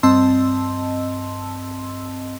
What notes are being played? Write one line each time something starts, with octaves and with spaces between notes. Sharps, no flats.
G2 C4 D#5 A5 C6 E6